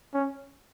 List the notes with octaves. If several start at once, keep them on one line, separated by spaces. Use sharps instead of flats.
C#4